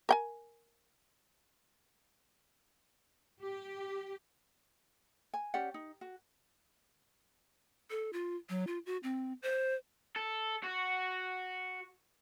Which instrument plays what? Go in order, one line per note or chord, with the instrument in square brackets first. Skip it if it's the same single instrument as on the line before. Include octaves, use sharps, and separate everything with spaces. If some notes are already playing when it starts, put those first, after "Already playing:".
[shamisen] A#4 G5 G#5
[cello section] G4
[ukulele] G#5
C#4 G4 D5 F#5
D#4
F#4
[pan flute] A4
F4
F#3
F4
F#4
C4
C5
[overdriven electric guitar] A4
F#4